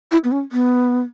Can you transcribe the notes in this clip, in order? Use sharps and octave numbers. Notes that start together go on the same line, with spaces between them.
E4
B3
C#4
B3